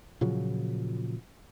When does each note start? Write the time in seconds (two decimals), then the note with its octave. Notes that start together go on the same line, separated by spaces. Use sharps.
0.21 A#2 C#3 F3 F#3